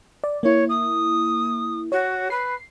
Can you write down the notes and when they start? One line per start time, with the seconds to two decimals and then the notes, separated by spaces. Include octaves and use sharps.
0.24 D5
0.43 A#3 E4 C#5
0.69 D#6
1.92 F#4 C#5
2.30 B4 C7